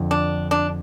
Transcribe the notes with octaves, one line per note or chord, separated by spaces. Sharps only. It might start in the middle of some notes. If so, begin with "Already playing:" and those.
Already playing: F2 D3 F3
D4
D4